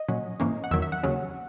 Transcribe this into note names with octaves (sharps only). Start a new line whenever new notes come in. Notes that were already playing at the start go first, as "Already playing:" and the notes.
Already playing: D#5
A#2 F#3 C#4
G#2 E3 A#3 C#4
F#5
E2 D#3 F#3 E5
E5
F#5
D#2 C#3 F#3 C#4